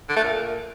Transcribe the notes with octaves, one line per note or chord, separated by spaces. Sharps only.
D3
A3
A#2